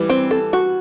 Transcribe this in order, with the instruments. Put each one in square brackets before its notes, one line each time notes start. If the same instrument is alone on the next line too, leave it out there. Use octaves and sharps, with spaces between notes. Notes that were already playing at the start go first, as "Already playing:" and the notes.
Already playing: [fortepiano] E3 G3
[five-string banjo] C4
A4
F#4